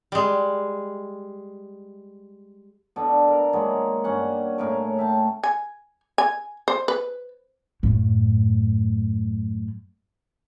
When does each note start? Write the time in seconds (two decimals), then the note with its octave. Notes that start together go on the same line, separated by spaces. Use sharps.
0.12 G3 G#3
2.96 B2 D4 A4
3.28 A#4
3.53 D#3 F#3 G#3 A#3
4.04 G2 C#4 F#5
4.58 A2 C#3 A#4
4.99 E5 G5 A5
5.44 G#5
6.18 G#5
6.68 C5
6.88 B4
7.83 F#2 A2